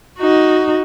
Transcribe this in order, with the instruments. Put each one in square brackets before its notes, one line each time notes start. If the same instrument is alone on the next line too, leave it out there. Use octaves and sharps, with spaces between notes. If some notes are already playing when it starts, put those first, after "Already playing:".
[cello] D#4 F#4